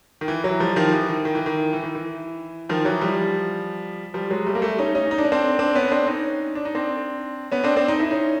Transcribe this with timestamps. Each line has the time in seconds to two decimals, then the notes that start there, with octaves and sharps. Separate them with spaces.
0.21 D#3
0.28 E3
0.44 E3 F#3
0.60 F3 G3
0.76 D#3 F3
0.92 E3
1.09 D#3
1.25 D#3
1.35 E3
1.46 D#3
1.73 E3
1.84 D#3
1.95 E3
2.69 D#3 F3
2.85 E3 F#3
3.01 F3 G3
4.14 F3 G3
4.30 F#3 G#3
4.46 G3 A3
4.55 A#3
4.62 G3 A3
4.79 C#4 D#4
4.95 C#4 D#4
5.11 D#4
5.18 D4
5.25 C#4
5.32 C4 D4
5.59 C4 D4
5.75 B3 C#4
5.91 C4 D4
6.07 C#4 D#4
6.55 D4
6.65 D#4
6.75 C4 D4
7.52 B3 C#4
7.64 C4 D4
7.76 C4 D4
7.88 D#4
8.00 E4
8.11 C#4 D#4